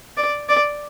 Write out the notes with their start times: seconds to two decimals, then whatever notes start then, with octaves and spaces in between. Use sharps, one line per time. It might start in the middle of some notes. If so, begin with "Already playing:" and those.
0.17 D5
0.49 D5